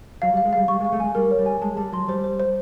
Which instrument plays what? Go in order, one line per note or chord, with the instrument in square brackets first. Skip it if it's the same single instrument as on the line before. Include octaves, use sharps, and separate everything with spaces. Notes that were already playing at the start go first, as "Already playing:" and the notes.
[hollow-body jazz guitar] F#3 [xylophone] F5
[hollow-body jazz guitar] G3
[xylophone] F5
[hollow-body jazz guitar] G#3
[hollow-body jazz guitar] G3 [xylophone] F5
[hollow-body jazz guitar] G3 [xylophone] C#6
[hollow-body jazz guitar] G#3
[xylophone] F5
[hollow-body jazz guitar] A3
[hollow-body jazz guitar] G#3 [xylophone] G#5
[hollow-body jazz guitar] G3 [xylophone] A#4
[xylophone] C#5
[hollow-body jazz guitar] G3
[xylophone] G#5
[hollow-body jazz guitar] G#3 [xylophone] A5
[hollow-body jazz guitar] G3 [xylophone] A5
[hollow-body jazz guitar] F#3 [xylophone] C6
[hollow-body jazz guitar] G3 [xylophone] C5
[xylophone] C5
C5